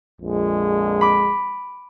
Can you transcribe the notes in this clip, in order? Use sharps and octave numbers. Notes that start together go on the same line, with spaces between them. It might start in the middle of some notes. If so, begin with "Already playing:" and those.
A#1 F2 G#3
B5 D6